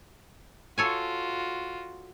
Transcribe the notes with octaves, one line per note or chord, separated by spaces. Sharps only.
F4 F#4 A4 C#5 G#5